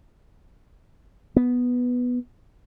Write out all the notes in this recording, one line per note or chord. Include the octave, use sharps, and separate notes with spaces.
B3